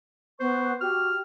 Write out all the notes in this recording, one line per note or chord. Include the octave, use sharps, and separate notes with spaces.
B3 C5 C#6
F#4 G4 F6